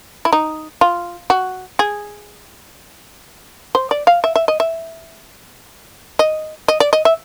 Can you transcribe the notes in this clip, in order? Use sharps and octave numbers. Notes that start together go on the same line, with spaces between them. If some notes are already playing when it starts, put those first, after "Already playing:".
E4
D#4
F4
F#4
G#4
C5
D5
F5
E5
E5
D#5
E5
D#5
D#5
D5
D#5
E5